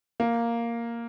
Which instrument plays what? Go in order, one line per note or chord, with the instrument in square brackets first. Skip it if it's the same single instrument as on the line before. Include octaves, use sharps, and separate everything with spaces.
[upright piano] A#3